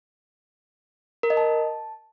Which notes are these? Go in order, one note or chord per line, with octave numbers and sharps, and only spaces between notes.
A#4
D#5
A5